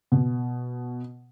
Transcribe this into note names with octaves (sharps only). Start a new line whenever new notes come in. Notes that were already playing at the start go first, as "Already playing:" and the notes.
B2